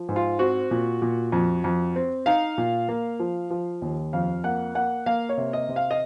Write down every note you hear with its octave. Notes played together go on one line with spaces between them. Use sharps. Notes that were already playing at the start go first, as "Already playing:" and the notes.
Already playing: F3
G#2
F4
C4 F#4
A#2
A#2
F2
F2
C4
D#4 F5
A#2
A#3
F3
F3
D#2
F2 F5
A#3 F#5
A#3 F#5
A#3 F5
C#5
C3
D#5
C3
F5
D#5